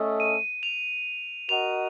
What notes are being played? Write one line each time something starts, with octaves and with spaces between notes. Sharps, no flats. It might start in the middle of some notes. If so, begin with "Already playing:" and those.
Already playing: A3 C#4 A4 D#5
D#7
F7
F#4 A#4 D#5 F#5 F7